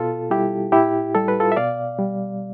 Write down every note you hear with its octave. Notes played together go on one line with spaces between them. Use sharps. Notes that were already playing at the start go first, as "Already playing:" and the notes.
Already playing: B2 F4 A4
G3 E4 G4
A2 E4 G4
G3 A4
B4
F4 A4
E5
B2 D5 F5
G3